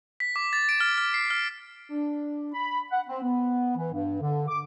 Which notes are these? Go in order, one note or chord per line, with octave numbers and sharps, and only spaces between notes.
B6
D6
A6
D7
F6
F6
C7
F6
D4
B5
F#5
C4
B3
E3
G2
D3
D6